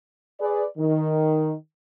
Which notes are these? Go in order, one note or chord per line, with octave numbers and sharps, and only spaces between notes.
G#4 B4 D5
D#3